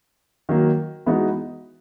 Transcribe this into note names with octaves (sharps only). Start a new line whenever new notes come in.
D#3 F#3 A#3
E3 G#3 B3 D#4 F#4